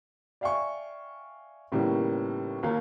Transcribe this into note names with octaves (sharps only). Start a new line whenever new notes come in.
D5 E5 F5 G5 G#5 C#6
D#2 A2 C#3 G3 A#3 B3
D#2 A#3 F4 A#4 F5